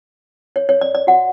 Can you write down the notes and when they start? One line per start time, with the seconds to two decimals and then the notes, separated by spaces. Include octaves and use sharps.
0.56 C#5
0.69 C#5
0.81 D5
0.95 D5
1.07 F#4 C#5 F#5